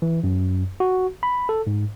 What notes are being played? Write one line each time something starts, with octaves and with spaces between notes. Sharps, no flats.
E3
F#2
F#4
B5
A4
G#2